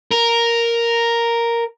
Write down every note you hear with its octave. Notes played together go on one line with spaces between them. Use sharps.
A#4